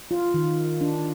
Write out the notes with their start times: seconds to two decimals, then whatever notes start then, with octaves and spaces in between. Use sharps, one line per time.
0.11 F4
0.34 D#3
0.81 D4